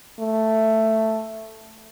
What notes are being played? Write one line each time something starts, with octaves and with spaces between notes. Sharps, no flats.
A3